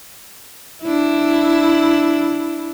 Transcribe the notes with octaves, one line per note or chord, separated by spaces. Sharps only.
D4 E4